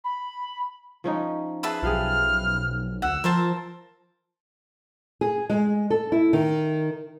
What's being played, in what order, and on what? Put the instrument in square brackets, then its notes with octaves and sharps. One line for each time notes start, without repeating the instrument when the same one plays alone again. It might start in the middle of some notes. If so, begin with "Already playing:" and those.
[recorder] B5
[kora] F3 C#4 D#4
[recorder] G#4 [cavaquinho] B4 E5 A5
[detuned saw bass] B1 [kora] F3 G4 G#4 [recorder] F6
[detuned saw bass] D2 [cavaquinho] F#5 [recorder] E6
[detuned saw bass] F3 [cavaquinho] A#4 C5 A5
[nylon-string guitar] G#4
G#3
A4
E4
D#3